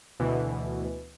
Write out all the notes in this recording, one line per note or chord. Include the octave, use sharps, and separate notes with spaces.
D2 B2 E3